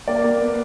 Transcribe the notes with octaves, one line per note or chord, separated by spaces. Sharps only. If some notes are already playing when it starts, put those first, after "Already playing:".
A#3 D5
A#3
B3